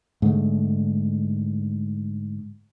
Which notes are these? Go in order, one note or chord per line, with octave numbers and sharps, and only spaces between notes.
G#2 D3 A3